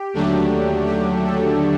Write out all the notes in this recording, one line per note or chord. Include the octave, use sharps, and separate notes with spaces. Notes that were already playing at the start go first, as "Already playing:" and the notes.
Already playing: G4
D#2 D3 F#3 A3 D4
G4
A4